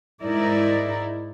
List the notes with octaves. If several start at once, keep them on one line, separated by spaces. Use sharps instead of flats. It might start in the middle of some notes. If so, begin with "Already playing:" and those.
G#2 D#4 E4 A#4 D5